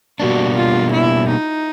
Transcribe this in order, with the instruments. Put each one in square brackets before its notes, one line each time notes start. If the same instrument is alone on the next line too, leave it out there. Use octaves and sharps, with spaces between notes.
[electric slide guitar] B2 G3 A#3 D4 [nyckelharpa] F#4
[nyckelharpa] F4
E4
D#4